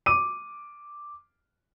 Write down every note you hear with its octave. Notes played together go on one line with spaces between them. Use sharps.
D6 D#7